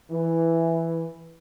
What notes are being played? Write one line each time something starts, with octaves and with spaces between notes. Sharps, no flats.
E3